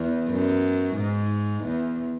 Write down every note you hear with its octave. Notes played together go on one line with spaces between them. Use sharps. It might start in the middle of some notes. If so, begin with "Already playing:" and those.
Already playing: E2
F#2
G#2
E2